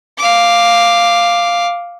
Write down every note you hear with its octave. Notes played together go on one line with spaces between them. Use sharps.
F5 D6